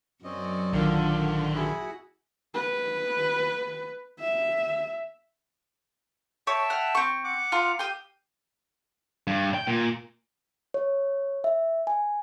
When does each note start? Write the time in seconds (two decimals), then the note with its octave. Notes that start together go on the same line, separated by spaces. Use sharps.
0.24 F#2 F#3 C4 C#4 D5 D#5
0.73 A#1 D3 D#3 F4
1.55 E4 F#4 G#4 B5
2.54 B4
4.20 E5
6.47 C#5 E5 G5 A5
6.70 F#5 F6
6.95 C4 C#6
7.24 F#5 D6
7.52 F4 A#5 C6
7.79 G4 F5 G5 D#6
9.27 G2
9.55 G5
9.67 A#2
10.74 C#5
11.44 E5
11.87 G#5